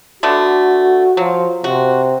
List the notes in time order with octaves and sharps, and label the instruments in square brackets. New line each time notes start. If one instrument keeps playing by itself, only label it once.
[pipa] D3 A3 B3 [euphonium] F#4
[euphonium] F3 [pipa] F#3
[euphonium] C3 [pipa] F#4